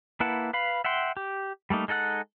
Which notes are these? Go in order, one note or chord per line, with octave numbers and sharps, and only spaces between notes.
A#3 E4 B4 F#5 A5
B4 F5 B5
E5 F#5 G5 C6
G4
G3 A3 A#3 D#4
G#3 D#4 A4 F#5 F#6